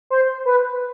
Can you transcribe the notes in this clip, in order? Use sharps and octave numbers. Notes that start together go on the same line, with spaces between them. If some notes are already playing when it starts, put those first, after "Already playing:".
C5
B4